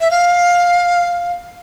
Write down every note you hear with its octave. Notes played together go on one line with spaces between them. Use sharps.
E5
F5